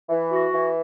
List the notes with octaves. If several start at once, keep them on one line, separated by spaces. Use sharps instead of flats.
E3
F#4
E3